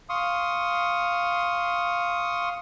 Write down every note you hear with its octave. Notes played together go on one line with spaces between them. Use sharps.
F5 C6 C#6 D#6